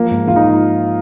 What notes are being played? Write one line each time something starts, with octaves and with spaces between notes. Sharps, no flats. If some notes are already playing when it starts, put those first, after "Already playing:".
Already playing: F3 A#3
G#2
F3 F4
D#4